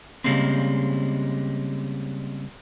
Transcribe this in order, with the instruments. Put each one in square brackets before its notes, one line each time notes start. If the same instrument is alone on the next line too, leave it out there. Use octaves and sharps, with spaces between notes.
[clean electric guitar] C#3 E3 G3 G#3 A#3 C4